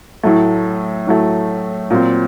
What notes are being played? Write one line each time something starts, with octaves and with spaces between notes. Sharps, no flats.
A2 F#3 A3
A2 F#3 A3
A#2 F#3 C4